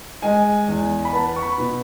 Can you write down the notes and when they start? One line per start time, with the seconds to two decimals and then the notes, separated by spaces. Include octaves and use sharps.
0.22 G#3 G#5
0.68 E2
1.05 B5
1.13 B3 A5
1.36 C#6
1.42 B5
1.58 B2